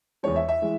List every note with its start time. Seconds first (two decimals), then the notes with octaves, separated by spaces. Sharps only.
0.23 E2 E3 G#3 C#5
0.36 E5
0.49 E5
0.62 E3 G#3